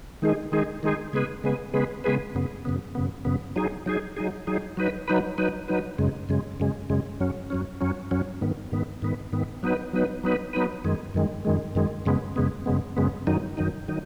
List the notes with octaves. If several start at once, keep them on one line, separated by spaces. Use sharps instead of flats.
D#3 G#3 D#4 G#4
D#3 G#3 D#4 G#4
D#3 G#3 D#4 G#4
C#3 G#3 B3 G#4 B4
C#3 G#3 B3 G#4 B4
C#3 G#3 B3 G#4 B4
C#3 G#3 B3 G#4 B4
F#2 C#3 B3
F#2 C#3 B3
F#2 C#3 B3
F#2 C#3 B3
F#3 D#4 G#4
F#3 D#4 G#4
F#3 D#4 G#4
F#3 D#4 G#4
F#3 D#4 B4
F#3 D#4 B4
F#3 D#4 B4
F#3 D#4 B4
F#2 C#3 G#3
F#2 C#3 G#3
F#2 C#3 G#3
F#2 C#3 G#3
F#2 F#3 C#4
F#2 F#3 C#4
F#2 F#3 C#4
F#2 F#3 C#4
G#2 D#3 B3
G#2 D#3 B3
G#2 D#3 B3
G#2 D#3 B3
F#3 B3 D#4 B4
F#3 B3 D#4 B4
F#3 B3 D#4 B4
F#3 B3 D#4 B4
F#2 D#3 G#3
F#2 D#3 G#3
F#2 D#3 G#3
F#2 D#3 G#3
F#2 C#3 G#3 B3
F#2 C#3 G#3 B3
F#2 C#3 G#3 B3
F#2 C#3 G#3 B3
F#2 D#3 F#3 D#4
F#2 D#3 F#3 D#4
D#3 F#3 D#4